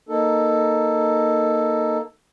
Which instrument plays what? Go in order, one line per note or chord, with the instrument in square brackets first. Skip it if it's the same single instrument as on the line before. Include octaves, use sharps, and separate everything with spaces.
[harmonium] A#3 D#4 A4